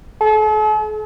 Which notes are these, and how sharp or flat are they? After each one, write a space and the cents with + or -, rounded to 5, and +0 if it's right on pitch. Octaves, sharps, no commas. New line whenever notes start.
A4 -45